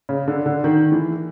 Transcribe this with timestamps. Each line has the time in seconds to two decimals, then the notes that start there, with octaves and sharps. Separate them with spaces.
0.09 C#3
0.28 D3
0.46 D3
0.64 D#3
0.92 E3